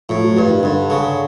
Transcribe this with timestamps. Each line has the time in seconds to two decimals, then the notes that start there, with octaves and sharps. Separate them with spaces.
0.09 A2 F3
0.23 F#3
0.36 G2 F3
0.50 D#3
0.63 G2 D3
0.90 C#3